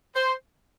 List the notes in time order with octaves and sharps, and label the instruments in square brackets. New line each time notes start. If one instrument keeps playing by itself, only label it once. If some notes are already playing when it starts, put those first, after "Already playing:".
[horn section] C5